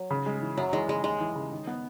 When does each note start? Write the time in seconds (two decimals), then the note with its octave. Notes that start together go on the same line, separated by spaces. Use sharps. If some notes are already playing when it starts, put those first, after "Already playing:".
Already playing: F#3
0.10 C#3
0.26 G#3
0.42 E3
0.57 F#2 F#3
0.73 E3 G#3
0.88 C#3 G#3
1.04 D#2 G#3
1.20 E3
1.35 C#3
1.51 D#3
1.67 B3